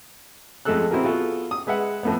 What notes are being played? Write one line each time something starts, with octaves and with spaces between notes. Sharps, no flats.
F2 G#3 A3 A4 E6 F#6
C4 E4 F#4 G#4 A#4
B3 F4 F#4 G#4 A4
D#6
G#3 B4 E5 F#5
F2 A2 B3